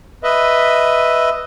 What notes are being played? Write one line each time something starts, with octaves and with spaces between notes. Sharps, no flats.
B4 D#5 E5